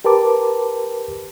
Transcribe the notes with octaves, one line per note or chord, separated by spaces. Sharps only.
G4 A#4 B4 A5 D6